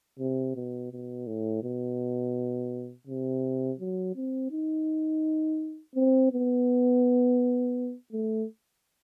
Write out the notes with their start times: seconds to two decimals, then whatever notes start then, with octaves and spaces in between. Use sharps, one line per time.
0.19 C3
0.55 B2
0.91 B2
1.27 A2
1.63 B2
3.07 C3
3.80 F#3
4.16 C4
4.51 D#4
5.95 C4
6.32 B3
8.12 A3